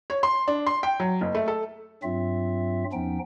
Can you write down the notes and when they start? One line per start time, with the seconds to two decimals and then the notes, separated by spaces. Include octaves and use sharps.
0.10 C#5
0.23 C6
0.48 D4
0.66 C6
0.83 G5
1.00 F#3
1.21 F#1
1.35 A3
1.48 A4
2.03 G2 F#3 C4 F4 E5
2.92 E2 F3 B3 C#4 D#4 G5